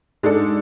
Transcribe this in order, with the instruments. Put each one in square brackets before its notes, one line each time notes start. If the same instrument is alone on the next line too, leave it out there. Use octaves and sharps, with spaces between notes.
[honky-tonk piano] G#2 G#3 D4 A4